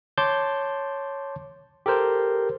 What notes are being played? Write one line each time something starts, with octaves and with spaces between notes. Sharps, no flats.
C#5 A5 C6 D6 G6
G4 A4 A#4 C5